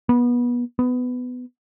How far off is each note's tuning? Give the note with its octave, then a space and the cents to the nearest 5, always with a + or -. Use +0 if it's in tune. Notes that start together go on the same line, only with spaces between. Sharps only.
B3 -25
B3 +15